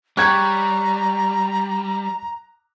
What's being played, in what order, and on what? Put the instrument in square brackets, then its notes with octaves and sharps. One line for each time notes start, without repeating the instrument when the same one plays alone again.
[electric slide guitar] G3 [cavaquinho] C#5 G5 [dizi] A#5 [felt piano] F#6 G#6